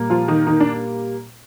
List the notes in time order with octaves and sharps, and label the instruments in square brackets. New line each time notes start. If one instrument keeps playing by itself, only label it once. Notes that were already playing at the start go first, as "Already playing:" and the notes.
Already playing: [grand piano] A#2 G3 A#3
[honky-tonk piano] F3 F4
D#3 D#4
D#3 D#4
D4